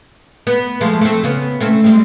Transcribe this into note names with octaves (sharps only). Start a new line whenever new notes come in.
B3
F3 G#3 A3
A3 C4
C#3 B3
A3 C4 C#4
G3 G#3 C4